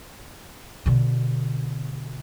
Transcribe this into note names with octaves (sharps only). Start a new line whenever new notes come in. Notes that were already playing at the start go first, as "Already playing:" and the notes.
B2 D3